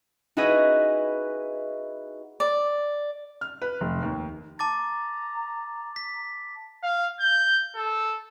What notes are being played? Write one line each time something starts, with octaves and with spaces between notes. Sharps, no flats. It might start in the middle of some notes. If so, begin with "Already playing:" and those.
D#4 E4 F#4 G#4 B4 D#5
D5
F6
B4
F1
D#2
A5 A#5 D6 A6
B6
F5
G6
A4